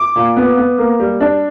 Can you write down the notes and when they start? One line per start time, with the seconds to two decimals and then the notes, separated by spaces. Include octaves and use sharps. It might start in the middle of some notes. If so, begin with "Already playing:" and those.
Already playing: D6
0.16 A#2
0.36 B3
0.57 B3
0.78 A#3
1.00 G3
1.20 D4